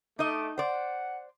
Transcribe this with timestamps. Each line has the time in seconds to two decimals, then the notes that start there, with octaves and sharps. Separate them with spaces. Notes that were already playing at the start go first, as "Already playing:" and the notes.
0.19 A3 D#4 D#5 D6
0.58 C5 D5 F#5